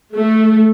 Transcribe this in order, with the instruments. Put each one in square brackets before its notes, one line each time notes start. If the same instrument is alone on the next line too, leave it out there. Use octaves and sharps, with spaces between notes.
[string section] A3